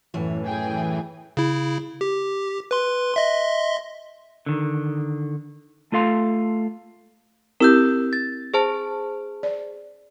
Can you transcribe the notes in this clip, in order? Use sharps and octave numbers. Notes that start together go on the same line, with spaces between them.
F#2 A2 E3 C#5
G#4 G5 G#5
C#3 E4
G4
B4 C6
D#5 E5 C6
D3 D#3
A3 F4 A4 F5 C6
C4 E4 G4 A#4 E6 G6
A6
G#4 C5 A5
D5